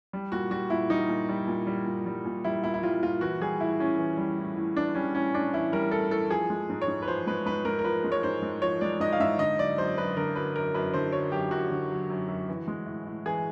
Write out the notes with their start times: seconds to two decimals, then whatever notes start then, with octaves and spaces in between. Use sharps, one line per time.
0.13 G3
0.32 A#2 F#4
0.51 G3 F#4
0.70 A#2 E4
0.89 G3 D#4
1.09 A#2
1.29 G3
1.48 A#2
1.67 G3
1.86 A#2
2.06 G3
2.25 A#2
2.44 G3 E4
2.64 A#2 E4
2.74 E4
2.83 G3 F4
3.03 A#2 F4
3.21 E3 F#4
3.41 G3 G#4
3.60 A2 E4
3.80 A2 C#4
3.98 E3
4.18 G3
4.38 A2
4.56 A2
4.77 E3 D4
4.95 G3 C#4
5.15 A2 C#4
5.34 A2 D4
5.53 E3 E4
5.72 G3 A#4
5.91 A2 A4
6.11 A2 A4
6.31 F3 G#4
6.50 G#3
6.70 G#2
6.81 C#5
6.88 G#2
7.02 B4
7.08 F3 C5
7.27 G#3 B4
7.46 G#2 B4
7.65 G#2 A#4
7.79 A#4
7.84 F3 B4
8.04 G#3
8.12 C#5
8.23 G#2 C5
8.42 G#2
8.62 F3 C#5
8.81 G#3 D5
9.00 G#2 D#5
9.13 F5
9.20 G#2 E5
9.39 D3 D#5
9.59 F#3 D5
9.77 F#2 C5
9.97 F#2 B4
10.17 D3 A#4
10.35 F#3 B4
10.55 F#2 A#4
10.74 F#2 B4
10.94 D3 C5
11.12 F#3 C#5
11.32 F#2 G4
11.51 F#2 F#4
11.71 D3
11.91 F#3
12.10 F#2
12.29 F#2
12.49 E3
12.68 G#3
12.86 A2
13.06 A2
13.26 E3 G#4